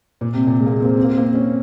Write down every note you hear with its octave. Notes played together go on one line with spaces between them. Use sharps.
A#2
C3
A#2
G#3
A#3
G#3
C4
A#3
C4
A#3
C4
A#3
C4
C#4